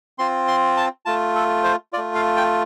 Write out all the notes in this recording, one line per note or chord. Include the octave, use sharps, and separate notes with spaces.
C4 F4 C6
C6
A5
A3 F4 A5
A4
C5
A3 F4 D5
F5
G5